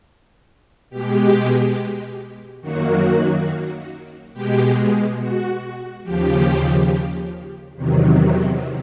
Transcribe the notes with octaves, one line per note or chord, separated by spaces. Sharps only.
B2 G#3 G4
F#2 D#3 F#3 A#3 F#4
B2 G#3 G4
F#4
D#2 C#3 F3 G4
E2 C3 D#3 F#3